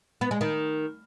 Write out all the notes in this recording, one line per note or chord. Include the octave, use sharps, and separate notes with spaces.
B3
G#3
D#3